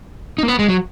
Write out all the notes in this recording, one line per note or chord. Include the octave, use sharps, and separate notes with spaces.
D#4
A#3
B3
G#3
F#3